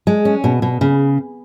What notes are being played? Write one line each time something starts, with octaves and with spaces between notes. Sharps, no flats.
G#3
C#4
B2
B2
C#3